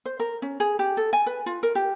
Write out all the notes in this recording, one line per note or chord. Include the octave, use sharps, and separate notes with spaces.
C5
A#4
C#4
G#4
G4
A4
G#5
B4
F4
A#4
G4